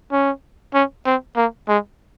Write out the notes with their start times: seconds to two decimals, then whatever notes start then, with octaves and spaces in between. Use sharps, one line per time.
0.12 C#4
0.74 C#4
1.06 C4
1.36 A#3
1.68 G#3